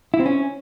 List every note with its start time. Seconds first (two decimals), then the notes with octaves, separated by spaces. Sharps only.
0.14 E4
0.20 C4
0.26 C#4